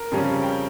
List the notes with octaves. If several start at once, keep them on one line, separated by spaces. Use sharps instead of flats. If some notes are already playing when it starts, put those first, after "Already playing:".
Already playing: A#4
F2 C#3 G3 C#4
G5